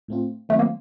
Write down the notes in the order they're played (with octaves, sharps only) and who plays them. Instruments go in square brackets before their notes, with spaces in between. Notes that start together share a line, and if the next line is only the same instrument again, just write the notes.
[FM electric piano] A2 A3 C4 F4
[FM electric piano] D#3 F#3 C4 F4 C5 [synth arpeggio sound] A3
[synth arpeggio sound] A#3